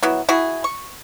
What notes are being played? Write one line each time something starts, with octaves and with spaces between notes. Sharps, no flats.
F#3 B3 E4
E4 F#4 G#4
C#6